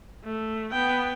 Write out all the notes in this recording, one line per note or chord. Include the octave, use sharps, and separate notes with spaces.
A3
B3 G5